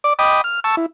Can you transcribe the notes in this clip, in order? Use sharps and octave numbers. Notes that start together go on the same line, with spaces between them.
D5 D6
D#5 G5 B5 D6 D#6
F6
A5 C#6 E6
E4